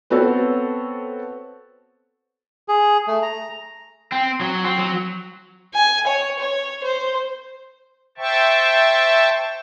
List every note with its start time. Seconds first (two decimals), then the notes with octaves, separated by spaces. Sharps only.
0.10 B3 C4 F#4 A4 C#5
2.68 G#4
3.08 A3
3.23 A#5
4.12 C4
4.41 F#3
4.64 C4
4.78 F#3
5.74 G#5
6.07 C#5
6.39 C#5
6.83 C5
8.18 C5 E5 G5 A5 C#6